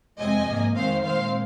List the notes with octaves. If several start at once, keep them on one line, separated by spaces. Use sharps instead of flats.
F2 C3 G#3 C4 D#5 G#5
G#2 F3 A#3
F2 D#3 G#3 C4 C5 F5
A#2 G#3 C4 C5 F5